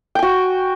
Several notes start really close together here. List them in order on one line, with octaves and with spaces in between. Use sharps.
G5 G#5 F#4